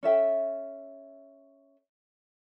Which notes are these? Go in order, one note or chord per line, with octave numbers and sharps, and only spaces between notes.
C#4 A4 E5 G5